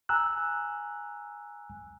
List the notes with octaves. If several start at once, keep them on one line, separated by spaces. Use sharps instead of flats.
G#5 A#5 E6 F#6